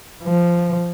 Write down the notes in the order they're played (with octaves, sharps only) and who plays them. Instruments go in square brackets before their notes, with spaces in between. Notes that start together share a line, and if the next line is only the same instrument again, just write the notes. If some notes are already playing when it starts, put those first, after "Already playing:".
[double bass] F3